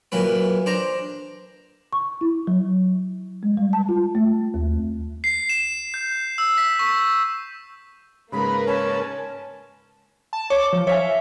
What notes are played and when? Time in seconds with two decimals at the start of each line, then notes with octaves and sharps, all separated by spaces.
0.12 A#2 E3 F#3 B4
0.66 D4 C5 A#5
1.93 C#6
2.21 E4
2.47 F#3
3.43 G#3
3.57 G3
3.73 A5
3.89 F4
4.15 A3
4.54 D#2
5.24 C7
5.49 E7
5.94 G6
6.38 E6
6.58 B6
6.79 C#6
8.32 G#2 C#3 G#3 A#3 A#4 B4 B5
8.66 C#4 A5
10.33 A5
10.50 C#5 D6
10.73 F3
10.87 C#5 E5 F5 G#5